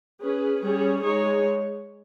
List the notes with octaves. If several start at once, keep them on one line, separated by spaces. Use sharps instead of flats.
C#4 G#4 B4
G3 C#4 G#4 C#5
G#3 D#4 G#4 C#5